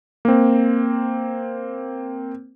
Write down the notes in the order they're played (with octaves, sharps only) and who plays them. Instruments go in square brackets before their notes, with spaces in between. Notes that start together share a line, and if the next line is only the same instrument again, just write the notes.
[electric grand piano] A#3 C4